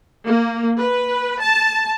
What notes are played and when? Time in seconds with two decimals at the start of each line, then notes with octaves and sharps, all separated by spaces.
0.27 A#3
0.78 B4
1.42 A5